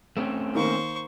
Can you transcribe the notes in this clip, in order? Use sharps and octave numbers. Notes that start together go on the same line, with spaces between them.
A3 C4 C#4
D#3 A#3 C5 C#6